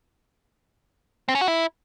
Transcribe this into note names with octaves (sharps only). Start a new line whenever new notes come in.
C4
C#4
F#4
E4